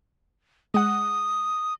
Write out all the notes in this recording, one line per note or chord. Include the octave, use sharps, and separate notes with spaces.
G#3 F#5 D#6